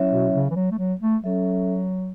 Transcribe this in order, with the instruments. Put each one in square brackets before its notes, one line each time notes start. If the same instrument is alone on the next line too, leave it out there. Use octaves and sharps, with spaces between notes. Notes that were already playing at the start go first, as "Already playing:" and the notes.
Already playing: [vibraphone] F#3 C#4 E4 C#5 E5
[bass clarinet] B2
C#3
E3
F#3
A3
F#3
A3
[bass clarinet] F#3 [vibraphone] C#4 A4 E5